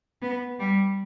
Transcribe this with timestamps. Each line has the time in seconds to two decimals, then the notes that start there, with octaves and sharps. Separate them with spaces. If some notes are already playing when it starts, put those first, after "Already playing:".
0.22 B3
0.59 G3